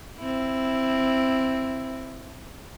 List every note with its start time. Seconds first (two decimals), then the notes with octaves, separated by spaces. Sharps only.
0.19 C4 E4